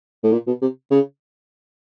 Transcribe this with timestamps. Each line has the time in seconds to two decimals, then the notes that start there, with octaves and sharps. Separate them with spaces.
0.24 A2
0.32 A#2
0.47 B2
0.62 C3
0.91 C#3